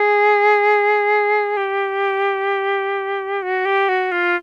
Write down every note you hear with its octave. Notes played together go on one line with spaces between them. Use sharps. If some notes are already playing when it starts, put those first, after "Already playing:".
Already playing: G#4
G4
F#4
G4
F#4
F4